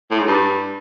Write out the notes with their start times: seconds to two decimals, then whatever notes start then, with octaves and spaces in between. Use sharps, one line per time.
0.11 A2
0.19 G#2
0.27 G2